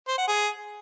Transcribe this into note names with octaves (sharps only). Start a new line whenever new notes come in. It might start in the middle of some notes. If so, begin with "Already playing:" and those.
C5
F#5
G#4